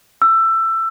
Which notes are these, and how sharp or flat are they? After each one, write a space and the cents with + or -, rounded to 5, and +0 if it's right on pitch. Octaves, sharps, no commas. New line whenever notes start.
E6 +20